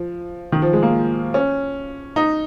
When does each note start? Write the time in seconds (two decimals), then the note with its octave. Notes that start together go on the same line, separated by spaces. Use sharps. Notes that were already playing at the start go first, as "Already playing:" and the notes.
Already playing: F3
0.52 D#3
0.62 F3
0.73 G#3
0.83 A#3
1.34 C#4
2.16 D#4